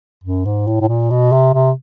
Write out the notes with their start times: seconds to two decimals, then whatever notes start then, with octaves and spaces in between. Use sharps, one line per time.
0.24 F#2
0.45 G#2
0.67 A2
0.81 A2
0.89 A#2
1.10 B2
1.32 C3
1.54 C3